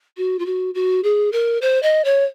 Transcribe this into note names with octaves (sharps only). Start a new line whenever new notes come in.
F#4
F4
F#4
F#4
G#4
A#4
C5
D#5
C#5